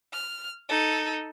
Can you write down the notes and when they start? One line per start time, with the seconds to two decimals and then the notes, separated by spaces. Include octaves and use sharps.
0.13 F6
0.69 D#4 A4